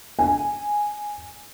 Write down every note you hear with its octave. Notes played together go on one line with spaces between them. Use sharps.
G#5